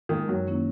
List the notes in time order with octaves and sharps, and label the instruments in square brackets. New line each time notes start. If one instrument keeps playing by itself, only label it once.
[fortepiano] D#3 [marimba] G#3 D#4
[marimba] F#2 [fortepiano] F#3
[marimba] D#3 A#3 C#4 E4